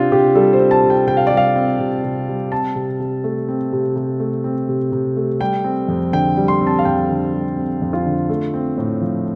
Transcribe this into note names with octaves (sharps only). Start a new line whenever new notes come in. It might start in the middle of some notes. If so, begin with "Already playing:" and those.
Already playing: C3 C4 D4 F4
C3 G4
G3 A4
C5
C4
A5
C3
G5
C3 G5
F5
G3 D5
F5
C4
C3
C3
G3
C4 A5
C3
C3
A3
C4
C3
C3
A3
C4
C3
C3
A3
G3 G5
C4
F2
D3 G5
G3
C6
C4
A5
F5
F2 G5
D3
G3
C4
F2
F4
D3
A3
C4
A2
F3